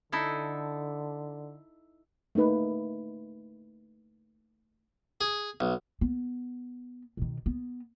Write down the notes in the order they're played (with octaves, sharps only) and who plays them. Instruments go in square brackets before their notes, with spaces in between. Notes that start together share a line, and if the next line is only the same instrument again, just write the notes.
[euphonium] D3 [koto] D#4 E4 A4
[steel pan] A3 A#3 D#4 B4
[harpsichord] G#4
B1
[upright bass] B3
B2 D#3
B3